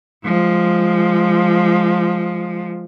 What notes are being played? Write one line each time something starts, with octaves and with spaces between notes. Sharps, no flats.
F3 G#3